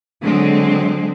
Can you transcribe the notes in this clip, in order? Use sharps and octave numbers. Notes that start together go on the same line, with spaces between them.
D3 F#3 G#3 C4